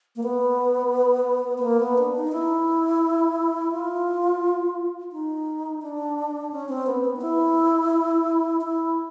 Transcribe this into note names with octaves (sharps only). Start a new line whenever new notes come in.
A#3
B3
B3
A#3
B3
D4
D#4
E4
F4
D#4
D4
C#4
C4
B3
B3
D#4
E4
E4